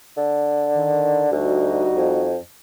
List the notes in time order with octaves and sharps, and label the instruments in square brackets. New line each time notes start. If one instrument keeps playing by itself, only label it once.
[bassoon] D3
[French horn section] D#3
[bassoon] D2 [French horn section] G3 D#4 F#4
[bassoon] F2